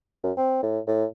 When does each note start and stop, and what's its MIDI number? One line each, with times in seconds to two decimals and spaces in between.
0.24 0.32 42
0.37 0.58 60
0.63 0.80 45
0.87 1.05 45